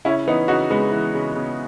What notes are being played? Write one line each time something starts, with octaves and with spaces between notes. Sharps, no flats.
C#3 C#4 E4
E3 B3 D#4
C#3 D#4 F#4
C#3 G#3 B3
E3
C#3
C#3